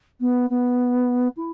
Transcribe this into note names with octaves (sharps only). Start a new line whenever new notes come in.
B3
B3
E4